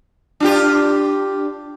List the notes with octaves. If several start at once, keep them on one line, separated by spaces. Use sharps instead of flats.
D4 F4 G4